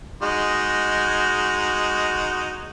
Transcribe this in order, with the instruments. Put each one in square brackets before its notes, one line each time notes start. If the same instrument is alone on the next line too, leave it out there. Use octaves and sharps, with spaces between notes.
[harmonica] G#3 D#4 F#4